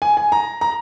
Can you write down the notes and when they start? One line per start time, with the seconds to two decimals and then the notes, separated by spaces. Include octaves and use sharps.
0.02 G#5
0.17 G#5
0.32 A#5
0.61 A#5